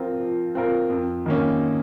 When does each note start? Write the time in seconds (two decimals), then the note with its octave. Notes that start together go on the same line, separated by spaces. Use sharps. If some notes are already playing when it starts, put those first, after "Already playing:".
Already playing: F3 C4 F4 A#4
0.20 F3
0.55 C4 F4 A#4
0.90 F2
1.26 D#3 A#3 C#4